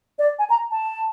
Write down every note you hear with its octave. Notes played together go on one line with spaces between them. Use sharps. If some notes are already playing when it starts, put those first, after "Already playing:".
D5
G#5
A#5
A5